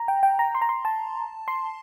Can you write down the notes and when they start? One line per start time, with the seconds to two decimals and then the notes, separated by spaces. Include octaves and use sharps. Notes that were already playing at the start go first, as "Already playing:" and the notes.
Already playing: A#5
0.08 G5
0.23 G5
0.39 A#5
0.55 C6
0.62 A#5
0.69 C6
0.85 A5
1.48 C6